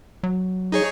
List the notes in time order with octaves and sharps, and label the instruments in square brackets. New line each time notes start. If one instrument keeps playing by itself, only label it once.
[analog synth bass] F#3
[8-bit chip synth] D#4 G#4 C#5